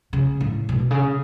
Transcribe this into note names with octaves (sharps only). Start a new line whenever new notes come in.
C#3
A2
B2
C#3